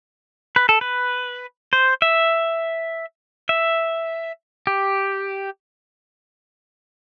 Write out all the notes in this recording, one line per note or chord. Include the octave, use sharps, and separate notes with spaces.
B4
A4
B4
C5
E5
E5
G4